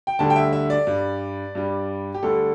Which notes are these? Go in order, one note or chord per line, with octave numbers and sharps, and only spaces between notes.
G5
D2 D3 G3 A5
G5
E5
E5
D5
G2 G3
G2 G3
G4
D2 D3 G3 A4